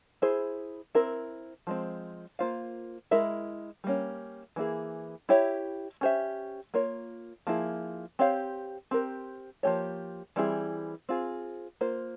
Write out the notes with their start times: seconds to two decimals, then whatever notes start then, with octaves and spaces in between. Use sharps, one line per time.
0.22 E4 G#4 C5
0.95 C4 E4 A#4
1.67 F3 G#3 C4
2.39 A#3 F4 C5 F5
3.11 G#3 E4 A#4 E5
3.84 G3 A#3 C#4
4.56 E3 A#3 E4 G#4
5.29 E4 G4 C#5 E5
6.01 C#4 G4 C5 E5
6.74 A#3 F4 A#4 C#5
7.47 F3 A#3 E4 G#4
8.19 C4 G4 C#5 F5
8.91 C4 G4 A#4
9.63 F3 A#3 C#4 G4 C#5
10.36 E3 G3 C4 E4 G#4
11.09 C4 F4 G#4
11.81 A#3 F4 C5